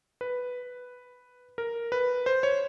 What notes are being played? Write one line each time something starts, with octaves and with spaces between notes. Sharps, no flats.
B4
A#4
B4
C5
C#5